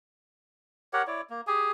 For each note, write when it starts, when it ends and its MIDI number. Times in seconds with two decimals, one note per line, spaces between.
0.93 1.02 67
0.93 1.02 70
0.93 1.02 73
0.93 1.02 78
1.07 1.21 64
1.07 1.21 73
1.07 1.21 74
1.30 1.41 58
1.47 1.72 67
1.47 1.72 68
1.47 1.72 80